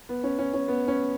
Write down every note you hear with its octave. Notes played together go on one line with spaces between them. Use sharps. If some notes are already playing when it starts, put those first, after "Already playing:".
B3
C#4
C#4
C#4
B3
C#4